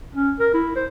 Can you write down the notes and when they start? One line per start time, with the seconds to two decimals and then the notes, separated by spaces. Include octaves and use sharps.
0.15 C#4
0.40 A#4
0.54 E4
0.76 C5